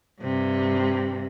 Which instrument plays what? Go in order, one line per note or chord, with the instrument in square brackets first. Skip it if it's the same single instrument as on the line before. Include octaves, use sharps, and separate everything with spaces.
[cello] G2 C3